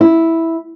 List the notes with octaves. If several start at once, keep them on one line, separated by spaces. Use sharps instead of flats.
E4